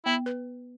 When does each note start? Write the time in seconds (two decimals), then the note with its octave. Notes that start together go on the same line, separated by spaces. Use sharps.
0.06 B3 E4
0.26 B4